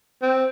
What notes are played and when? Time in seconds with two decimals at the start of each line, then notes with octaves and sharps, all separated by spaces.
0.22 C4